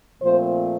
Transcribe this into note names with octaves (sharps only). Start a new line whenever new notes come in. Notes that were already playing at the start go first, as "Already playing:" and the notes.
A#2 F3 A3 C4 C5